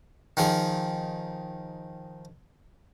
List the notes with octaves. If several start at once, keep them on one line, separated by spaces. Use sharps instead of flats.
D#3 F3 G#4